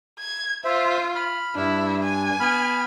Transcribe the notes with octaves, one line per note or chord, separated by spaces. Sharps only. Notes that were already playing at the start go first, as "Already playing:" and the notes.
G#6
F4 C5 E5
B5 F6
G2 D4 E4
G#5
B3 B5 F6